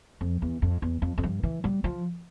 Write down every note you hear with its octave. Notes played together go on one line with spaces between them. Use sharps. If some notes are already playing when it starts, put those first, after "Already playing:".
F2
E2
F2
E2
F2
F2
G2
E3
G3
F3